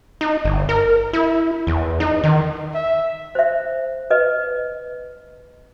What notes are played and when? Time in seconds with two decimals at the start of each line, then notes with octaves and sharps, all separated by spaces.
0.21 D#4
0.45 G1
0.69 A#4
1.13 E4
1.67 E2
2.00 D#4
2.24 D#3
2.75 E5
3.35 C5 E5
4.11 B4 D#5